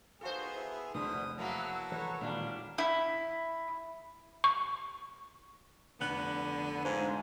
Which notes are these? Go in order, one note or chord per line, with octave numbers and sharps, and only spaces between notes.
B3 D#4 F4 F#4 G#4 A4 C5
E4
F1 E2 B2 D3 C5 D#6
F#3 A#3 B3 E4 F#4 A5
E3 A4 B4 C#5
E2 A#2 D#3 G3 G#3 D4 F5
E4
C#6
F1 D3 B3 F#6 F#7
G#2 F3 G#3 D4